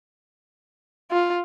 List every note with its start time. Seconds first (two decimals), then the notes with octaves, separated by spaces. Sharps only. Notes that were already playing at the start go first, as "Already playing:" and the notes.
1.11 F4